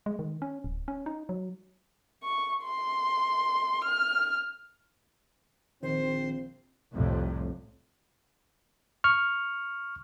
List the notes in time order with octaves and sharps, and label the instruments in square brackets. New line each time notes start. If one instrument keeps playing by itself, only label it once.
[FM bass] G#3
D#3
C#4
D1
C#4
D#4
F#3
[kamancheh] C#6
C6
F6
[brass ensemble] A#1 C4 [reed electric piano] D#3 [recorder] C5
[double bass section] C2 F2 A2 C3
[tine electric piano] C#6 F6